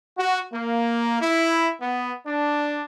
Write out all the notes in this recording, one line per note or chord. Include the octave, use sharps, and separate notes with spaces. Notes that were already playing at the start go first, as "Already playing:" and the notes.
F#4
A#3
E4
B3
D4